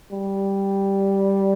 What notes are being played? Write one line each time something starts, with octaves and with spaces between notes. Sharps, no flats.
G3